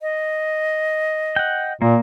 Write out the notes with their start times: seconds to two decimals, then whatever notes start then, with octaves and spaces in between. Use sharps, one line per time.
0.01 D#5
1.36 F#5 G5
1.82 A#2 A#3